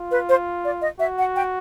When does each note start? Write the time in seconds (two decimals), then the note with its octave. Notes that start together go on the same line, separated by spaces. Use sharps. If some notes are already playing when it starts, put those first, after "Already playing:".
Already playing: F4
0.11 B4
0.29 C5
0.65 D5
0.82 D#5
1.00 F#4 E5
1.18 F#5
1.36 G5